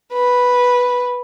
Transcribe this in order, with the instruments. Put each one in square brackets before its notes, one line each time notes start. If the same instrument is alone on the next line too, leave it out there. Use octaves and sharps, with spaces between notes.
[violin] B4